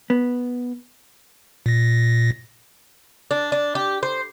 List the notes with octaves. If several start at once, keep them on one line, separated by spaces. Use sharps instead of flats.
B3
A#2 A#6
D4
D4
G4
C5